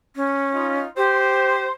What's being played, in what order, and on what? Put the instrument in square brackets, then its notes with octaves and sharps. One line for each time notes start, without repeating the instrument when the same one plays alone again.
[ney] C#4
[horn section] D#4 F4
[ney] G4 [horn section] C5